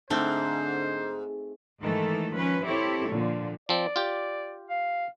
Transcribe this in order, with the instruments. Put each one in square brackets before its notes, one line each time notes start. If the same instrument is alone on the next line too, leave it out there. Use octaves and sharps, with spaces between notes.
[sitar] G#2 [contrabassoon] D3 [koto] A3 C4 [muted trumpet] C5
[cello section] G#2 D#3 E3 A3 A4
F3 C#4 B4
C4 E4 G4 A4 C#5
A#2 D3 F3
[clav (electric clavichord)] F3 C4 [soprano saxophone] D5
[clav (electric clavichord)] F4 G4
[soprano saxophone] F5